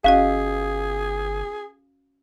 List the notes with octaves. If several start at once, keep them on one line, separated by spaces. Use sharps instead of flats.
G1 C#4 F#4 G#4 D#5 F5